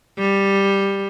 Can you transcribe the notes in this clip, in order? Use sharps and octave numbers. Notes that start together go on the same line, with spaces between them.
G3